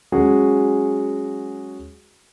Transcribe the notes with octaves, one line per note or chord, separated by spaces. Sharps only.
F#3 G#3 C#4 F#4 G#4